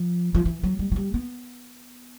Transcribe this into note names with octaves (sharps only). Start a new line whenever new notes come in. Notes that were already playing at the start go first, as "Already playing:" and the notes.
Already playing: F3
F3
E3
F#3
G3
F#3
G3
B3